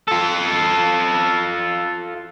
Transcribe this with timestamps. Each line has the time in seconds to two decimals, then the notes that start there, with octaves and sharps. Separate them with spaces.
0.08 F4 A4